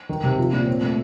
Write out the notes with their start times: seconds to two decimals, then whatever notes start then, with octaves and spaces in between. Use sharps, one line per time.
0.09 D#3
0.24 C3
0.39 F3
0.53 A#2
0.67 C4
0.82 A3